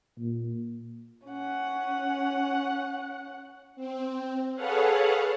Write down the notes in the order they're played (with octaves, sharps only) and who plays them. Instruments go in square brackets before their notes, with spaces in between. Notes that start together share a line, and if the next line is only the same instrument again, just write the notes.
[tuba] A#2
[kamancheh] C#4 F#5
[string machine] C4
G#4 A4 B4 C#5 F5 F#5